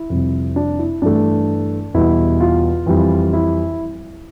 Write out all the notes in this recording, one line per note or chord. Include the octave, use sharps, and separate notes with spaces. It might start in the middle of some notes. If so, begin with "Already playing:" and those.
Already playing: E4
F2 C3 G3
D4
E4
G2 E3 A3 D4
E2 B2 G3 E4
F4
F2 E3 G3
E4